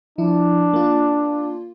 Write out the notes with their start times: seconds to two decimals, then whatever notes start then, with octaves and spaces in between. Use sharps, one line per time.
0.18 F3 D4 E4
0.73 A#3 F4